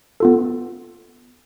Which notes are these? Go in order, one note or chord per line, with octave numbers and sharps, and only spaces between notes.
B3 F4 A4